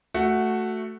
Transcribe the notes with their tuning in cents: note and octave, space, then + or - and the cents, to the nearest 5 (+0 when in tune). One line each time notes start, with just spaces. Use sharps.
A3 +0 F#4 +0 F#5 +15